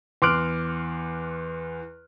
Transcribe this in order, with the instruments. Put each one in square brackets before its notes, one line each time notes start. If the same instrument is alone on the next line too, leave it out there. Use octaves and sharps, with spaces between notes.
[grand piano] E2 C6 D6 F6 F#6 D7